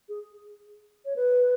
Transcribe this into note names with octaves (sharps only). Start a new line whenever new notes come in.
G#4
C#5
B4